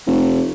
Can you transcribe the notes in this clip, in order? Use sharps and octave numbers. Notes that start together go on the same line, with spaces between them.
F1